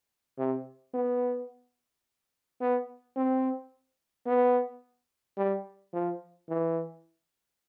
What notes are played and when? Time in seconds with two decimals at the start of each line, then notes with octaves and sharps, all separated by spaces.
0.38 C3
0.94 B3
2.61 B3
3.16 C4
4.26 B3
5.37 G3
5.93 F3
6.49 E3